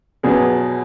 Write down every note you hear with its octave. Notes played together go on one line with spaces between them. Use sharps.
E2 B2 F#3 G#4